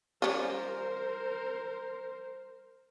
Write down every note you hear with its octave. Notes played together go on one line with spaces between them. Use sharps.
G3 C#4 F4 A#4 C5